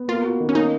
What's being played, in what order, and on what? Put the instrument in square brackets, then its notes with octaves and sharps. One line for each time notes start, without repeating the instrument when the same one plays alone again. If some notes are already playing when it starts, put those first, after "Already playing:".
Already playing: [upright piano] B3
[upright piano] A#3 [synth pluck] F4
[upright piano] F#4
D#3
[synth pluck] C#4
[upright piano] A#3 [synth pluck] D#4